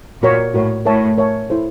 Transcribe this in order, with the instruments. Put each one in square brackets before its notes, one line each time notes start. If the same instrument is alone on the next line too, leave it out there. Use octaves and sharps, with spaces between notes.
[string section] A#2 [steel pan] F#4 A#4 C#5
[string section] A2 [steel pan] F#4 A#4 C#5
[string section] A2 [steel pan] A#4 C#5 E5 A5
[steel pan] A#4 C#5 E5 A5
E4 A4 C5